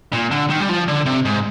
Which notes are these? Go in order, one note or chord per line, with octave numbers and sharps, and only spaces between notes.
A#2
D3
D#3
G3
F3
D3
C3
G#2